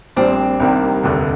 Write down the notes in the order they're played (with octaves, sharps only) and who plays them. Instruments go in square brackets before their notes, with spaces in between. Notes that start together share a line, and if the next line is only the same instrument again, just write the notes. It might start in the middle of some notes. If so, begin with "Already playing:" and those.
[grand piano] A#1 A#2 G3 D4 [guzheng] C4
[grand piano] C2 C3 D#3 G3 A#3
F1 D#2 D3